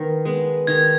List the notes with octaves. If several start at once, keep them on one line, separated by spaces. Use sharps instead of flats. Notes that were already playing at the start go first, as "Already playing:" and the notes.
Already playing: D#3 B3
G#3 B3
D#3 G#6